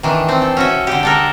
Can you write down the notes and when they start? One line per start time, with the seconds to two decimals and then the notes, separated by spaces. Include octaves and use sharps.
0.03 D#3 E3 D4
0.29 A3 C4
0.42 A4
0.57 C#4 F#4 E5
0.87 D3 G4
1.03 D4 A4 A#4